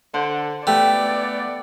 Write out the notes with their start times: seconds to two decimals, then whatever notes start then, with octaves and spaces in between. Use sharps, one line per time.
0.14 D3 C5
0.67 A3 B3 G4 D5